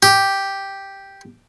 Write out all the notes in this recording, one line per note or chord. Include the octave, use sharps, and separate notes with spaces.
G4